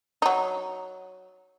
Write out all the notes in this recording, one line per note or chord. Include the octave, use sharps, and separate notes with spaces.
F#3 D#4